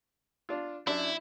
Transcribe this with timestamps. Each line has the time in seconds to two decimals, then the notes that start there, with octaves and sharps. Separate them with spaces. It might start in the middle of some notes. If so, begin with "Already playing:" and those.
0.49 D4 F4
0.87 F#2 D4 E4 E5